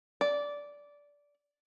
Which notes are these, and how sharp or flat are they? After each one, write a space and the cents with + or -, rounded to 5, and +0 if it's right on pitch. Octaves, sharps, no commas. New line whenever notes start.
D5 -15